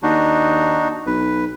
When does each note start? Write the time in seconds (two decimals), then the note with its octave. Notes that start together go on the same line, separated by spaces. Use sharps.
0.03 D#2 D4 D#4 F#4
1.06 B1 B4